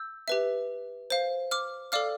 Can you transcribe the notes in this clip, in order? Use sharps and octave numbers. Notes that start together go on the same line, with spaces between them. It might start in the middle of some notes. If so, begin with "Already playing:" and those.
Already playing: E6 G6
G4 B4 E5
C5 F5
D6 F6
A4 D5 F5 D6 F6